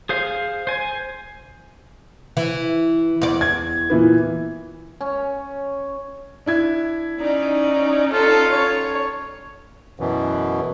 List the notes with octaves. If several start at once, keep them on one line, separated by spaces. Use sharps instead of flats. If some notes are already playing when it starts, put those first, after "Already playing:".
G#4 C5 F5
C5 G#5
E3
E2 D5
G#6
A#2 E3 B3
C#4
D4 E4 G#6
C#4 D#4 D5
F4 A4
C#5
F#2 B2 E3